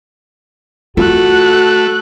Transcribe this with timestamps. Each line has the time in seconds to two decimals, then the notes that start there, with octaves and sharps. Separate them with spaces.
0.97 A3 F4 F#4 A4 F#6